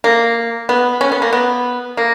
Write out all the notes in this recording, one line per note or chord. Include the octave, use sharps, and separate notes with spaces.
A#3
B3
C#4
B3
A#3
B3
A#3